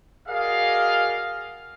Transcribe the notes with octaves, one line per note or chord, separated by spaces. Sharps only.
F#4 G#4 A#4 D5 D#5 F5